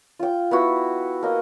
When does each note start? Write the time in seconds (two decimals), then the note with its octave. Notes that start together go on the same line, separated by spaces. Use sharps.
0.19 F4 G5
0.51 B3 E4 F#4
1.23 A#3 D#5